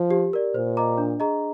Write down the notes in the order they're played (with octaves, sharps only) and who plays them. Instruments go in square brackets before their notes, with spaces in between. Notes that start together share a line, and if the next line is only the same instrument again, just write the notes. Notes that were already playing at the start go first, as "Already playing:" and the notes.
Already playing: [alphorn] F3
[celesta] G4
A#4 D5
[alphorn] A#2 [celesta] C5
[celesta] D#5 A#5 D6
D4
G#4 D#5 A#5